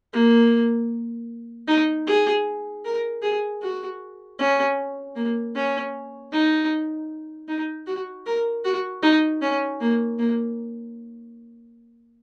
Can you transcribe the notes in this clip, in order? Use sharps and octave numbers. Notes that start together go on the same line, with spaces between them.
A#3
D#4
G#4
A#4
G#4
F#4
C#4
A#3
C#4
D#4
D#4
F#4
A#4
F#4
D#4
C#4
A#3
A#3